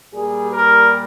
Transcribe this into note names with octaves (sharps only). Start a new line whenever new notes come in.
A#2 G3 G#4
A#4